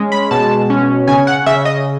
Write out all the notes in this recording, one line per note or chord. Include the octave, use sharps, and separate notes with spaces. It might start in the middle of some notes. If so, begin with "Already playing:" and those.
Already playing: G#3 C#4
B5
B2 A5
C#4
C#3 G#5
F#5
C#3 E5
D#5